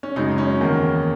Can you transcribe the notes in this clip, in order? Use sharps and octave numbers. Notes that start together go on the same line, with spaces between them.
C#4
F#2 C#3 G#3 D#4
C#4
E2 D#3 A#3